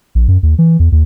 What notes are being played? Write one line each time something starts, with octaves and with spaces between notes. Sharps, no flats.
A#1
F#2
D#2
E3
E2
D#2